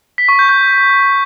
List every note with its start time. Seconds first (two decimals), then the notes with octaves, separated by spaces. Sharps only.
0.18 B6
0.28 C#6
0.39 G6
0.49 G6